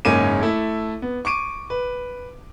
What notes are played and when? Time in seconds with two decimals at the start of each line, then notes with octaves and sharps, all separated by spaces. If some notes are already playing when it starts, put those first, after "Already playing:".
0.05 F#1 G#2 A#3 C#4 D6 D#7
0.41 A3 E4 A4
1.02 B3
1.25 C#6 D6 D7 D#7
1.70 B4